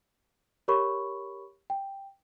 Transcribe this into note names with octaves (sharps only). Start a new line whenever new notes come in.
G4 A#4 C#5 B5 C#6
G5